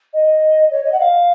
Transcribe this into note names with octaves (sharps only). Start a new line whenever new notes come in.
D#5
C#5
D#5
F#5
F5